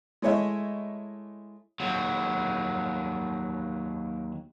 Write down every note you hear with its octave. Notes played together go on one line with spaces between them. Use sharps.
G#3 A3 E4 C#5 D#5 E5
D#2 F#3